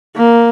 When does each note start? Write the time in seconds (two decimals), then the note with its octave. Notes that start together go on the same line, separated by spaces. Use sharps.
0.16 A#3